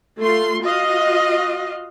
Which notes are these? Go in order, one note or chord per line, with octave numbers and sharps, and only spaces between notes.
A3 F4 C6
F4 F#4 D#5 F5